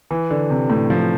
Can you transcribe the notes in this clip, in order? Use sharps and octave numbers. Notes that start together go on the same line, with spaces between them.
E3
D3
C3
A2
F3